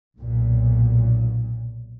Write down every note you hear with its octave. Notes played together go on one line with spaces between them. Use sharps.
B1 A#2